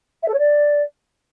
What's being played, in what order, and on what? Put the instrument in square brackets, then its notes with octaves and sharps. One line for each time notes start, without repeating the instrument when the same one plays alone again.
[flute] E5
A4
C#5
D5